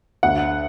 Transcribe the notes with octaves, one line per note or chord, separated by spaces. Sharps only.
D2 F#5